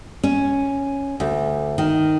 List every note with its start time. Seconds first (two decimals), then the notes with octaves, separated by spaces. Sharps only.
0.23 C#4
1.20 D2
1.78 D#3